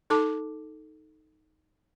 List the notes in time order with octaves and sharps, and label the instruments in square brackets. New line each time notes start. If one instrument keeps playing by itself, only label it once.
[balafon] D#4 A4 A5 D6